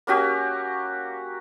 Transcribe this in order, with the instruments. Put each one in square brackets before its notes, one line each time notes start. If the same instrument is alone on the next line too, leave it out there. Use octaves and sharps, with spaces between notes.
[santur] A#3 C#4 F#4 G4